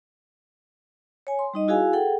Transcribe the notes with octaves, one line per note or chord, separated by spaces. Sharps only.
C#5 G#5
C6
G3 D#4 D#5
E4 F#4 G#4 F5 G#5
G#4 A4 F#5 G5